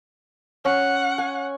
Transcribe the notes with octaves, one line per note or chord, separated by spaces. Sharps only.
C#4 F#5
G#5